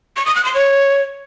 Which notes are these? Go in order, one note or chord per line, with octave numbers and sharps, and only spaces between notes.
C#6
D#6
F#6
C6
C#5